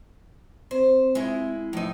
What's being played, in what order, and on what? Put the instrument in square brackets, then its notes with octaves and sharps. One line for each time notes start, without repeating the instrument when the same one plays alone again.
[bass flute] C4 [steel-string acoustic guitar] C5
[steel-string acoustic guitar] G#3 E4
[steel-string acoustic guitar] A2 D#4 [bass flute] F3